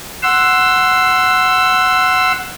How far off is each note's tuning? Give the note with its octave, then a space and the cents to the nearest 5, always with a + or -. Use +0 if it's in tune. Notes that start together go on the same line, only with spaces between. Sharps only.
F#5 +0 C6 +0 E6 +10